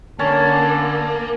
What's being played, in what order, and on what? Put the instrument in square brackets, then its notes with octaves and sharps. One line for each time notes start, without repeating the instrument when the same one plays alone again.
[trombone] D3 [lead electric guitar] A#3 [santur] C#4 [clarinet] A5